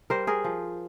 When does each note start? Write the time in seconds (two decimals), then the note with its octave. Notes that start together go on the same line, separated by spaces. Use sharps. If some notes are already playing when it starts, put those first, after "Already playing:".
0.10 G3 A#4 C5
0.27 G#4 A#4
0.44 F3